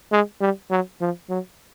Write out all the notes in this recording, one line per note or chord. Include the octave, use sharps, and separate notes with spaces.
G#3
G3
F#3
F3
F#3